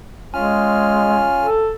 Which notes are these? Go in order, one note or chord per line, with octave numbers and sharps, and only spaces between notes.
G#3 C#4 F4 G#5 F6
A4